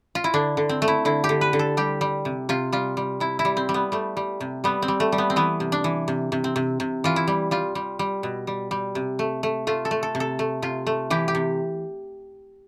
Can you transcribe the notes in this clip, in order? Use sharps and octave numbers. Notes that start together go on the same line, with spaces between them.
F4
E4
D3 D4
D3
C4
A3
E4
D3 E4
G4
D3
B4
D3
A4
G3 G4
G3
C3
C3 F4
G3 F4
G3
C3 E4
E4
G3
C4
G3
B3
G3 A3
G3
C3
G3 B3
C4
G3
A3
G3
B3
C4
E3 B3
C3
D4
E3
C3
C3
C4
C3
C3
E3 F4
E4
G3
G3 F4
G3
G3
B2
G3
G3
C3
A3
A3
A3 F4
A4
A3
A4
C3
A4
A3
C3 F4
A3
E3 G4
G4
C3